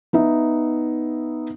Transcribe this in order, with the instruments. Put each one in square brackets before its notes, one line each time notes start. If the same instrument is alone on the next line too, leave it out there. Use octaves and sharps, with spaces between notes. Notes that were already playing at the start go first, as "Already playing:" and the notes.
[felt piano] B3 D#4 E5